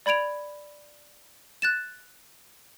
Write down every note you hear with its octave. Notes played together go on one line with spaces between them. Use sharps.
D5 B5 G#6 D7 F7
F#6 A6 E7